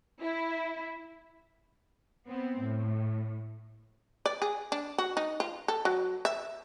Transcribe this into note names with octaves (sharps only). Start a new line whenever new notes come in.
E4
B3 C4
A2
D5
G#4
D4
F#4
D#4
F4
A4
F#3
E5